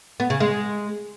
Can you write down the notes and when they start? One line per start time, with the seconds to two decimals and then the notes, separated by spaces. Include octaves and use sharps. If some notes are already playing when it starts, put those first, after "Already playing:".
0.20 B3
0.30 C#3
0.40 G#3